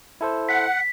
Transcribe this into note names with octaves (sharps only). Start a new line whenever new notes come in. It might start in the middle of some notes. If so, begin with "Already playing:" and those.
E4 A4 C5
F#5 B6